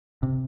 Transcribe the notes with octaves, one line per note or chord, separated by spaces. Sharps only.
C3